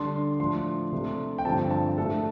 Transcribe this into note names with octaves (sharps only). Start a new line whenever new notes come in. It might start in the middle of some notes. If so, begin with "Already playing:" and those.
Already playing: D3 G3 D4 C6
A2 F3 D4 C6
C3 A3 D4
G5
G2 D3 F3 C4 A5
A5
A2 A3 D4 A4